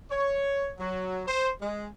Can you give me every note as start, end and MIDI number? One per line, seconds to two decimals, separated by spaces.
0.11 0.70 73
0.79 1.22 54
1.27 1.49 72
1.61 1.86 56